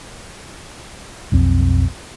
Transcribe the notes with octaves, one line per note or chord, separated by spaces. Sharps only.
B1 F2 C4